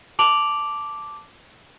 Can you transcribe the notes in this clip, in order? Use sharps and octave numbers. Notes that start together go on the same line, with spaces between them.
A5 D6 D7 F7 F#7